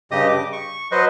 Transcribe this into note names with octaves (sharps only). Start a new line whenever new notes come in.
G2 C#3 G4 D#5 D#6
D6
C#6
F#3 B4 C5 D#5